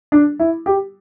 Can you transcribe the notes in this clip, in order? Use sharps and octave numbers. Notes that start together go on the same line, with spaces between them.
D4
E4
G4